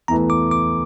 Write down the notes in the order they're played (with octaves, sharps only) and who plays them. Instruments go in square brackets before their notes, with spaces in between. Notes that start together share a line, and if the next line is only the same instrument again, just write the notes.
[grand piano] E2 E3 A3 [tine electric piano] A#5
[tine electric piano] D6
D6